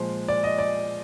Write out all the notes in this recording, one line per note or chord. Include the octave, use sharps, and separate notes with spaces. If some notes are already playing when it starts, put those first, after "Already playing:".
Already playing: A#2 F3 G#3 C5
D5
D#5
D5